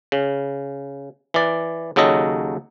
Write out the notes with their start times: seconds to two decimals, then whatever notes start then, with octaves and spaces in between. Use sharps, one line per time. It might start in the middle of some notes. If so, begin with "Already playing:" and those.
0.12 C#3
1.34 E3 D5
1.96 D#2 C#3 F#3 A4 D#5